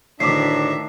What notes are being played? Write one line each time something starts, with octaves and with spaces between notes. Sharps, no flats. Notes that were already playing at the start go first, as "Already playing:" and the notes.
D2 A2 D#3 D4 E5 D6 B6 C7